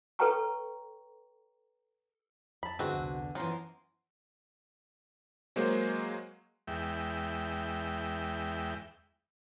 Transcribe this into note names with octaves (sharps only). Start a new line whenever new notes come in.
A4 B4 C#5 G5 A#5 C#6
F2 A5 B5
E2 D3 C4 F#4 G#4 B4 D#5
C2 F2
F#2 E3 F3 F#5 A#5 C6
F#3 G#3 A#3 F#4 C5
E2 G#3 E5 G5